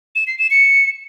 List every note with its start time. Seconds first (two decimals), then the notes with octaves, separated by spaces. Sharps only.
0.16 E7
0.27 C7
0.39 E7
0.51 C#7